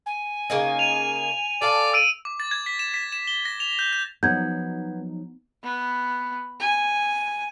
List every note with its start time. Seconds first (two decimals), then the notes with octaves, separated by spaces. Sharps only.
0.06 G#5
0.50 C#3 A#3 D#4
0.79 D#7 F7
1.62 A4 D5 F5
1.93 E6 D7 D#7
2.25 D6
2.40 A6
2.51 G#6
2.66 B6
2.79 E7
2.94 B6
3.12 E7
3.27 G7
3.45 A#6
3.60 F7
3.79 G6
3.93 G6
4.23 F3 F#3 B3 D#4 G6 G#6
5.63 B3
6.60 G#5